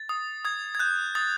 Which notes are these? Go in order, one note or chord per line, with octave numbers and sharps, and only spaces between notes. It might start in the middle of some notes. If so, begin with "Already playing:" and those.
Already playing: A6
D#6
D#6 G#6
G#6
F#6 G6
D#6 A6